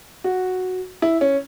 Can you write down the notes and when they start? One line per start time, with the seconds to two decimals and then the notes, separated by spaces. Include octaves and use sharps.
0.24 F#4
1.02 E4
1.21 C#4